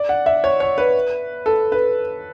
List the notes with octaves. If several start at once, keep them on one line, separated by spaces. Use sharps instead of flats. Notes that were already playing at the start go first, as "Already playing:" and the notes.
Already playing: D5
F#5
E5
C#5
C#5
B4
A4
B4